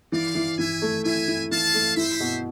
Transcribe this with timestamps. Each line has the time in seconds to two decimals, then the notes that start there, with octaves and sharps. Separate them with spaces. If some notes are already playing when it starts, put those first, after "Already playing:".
0.12 E3 D5 F5
0.35 E3
0.58 E3 E5 G#5
0.82 A3
1.04 E4 E5 G#5
1.28 E4
1.51 E3 F5 A5
1.74 A3
1.96 E4 C5 E5
2.20 B2